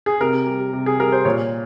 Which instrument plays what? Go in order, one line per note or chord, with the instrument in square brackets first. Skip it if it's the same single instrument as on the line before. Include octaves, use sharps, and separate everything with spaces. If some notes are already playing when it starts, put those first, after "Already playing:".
[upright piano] G#4
C3 A#4
G3
C3
G#4
G3 A#4
C5
A#2 C#5